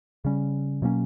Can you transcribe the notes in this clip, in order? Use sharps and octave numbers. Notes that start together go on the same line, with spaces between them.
C#3 G3 C#4
B2 F#3 A#3 C#4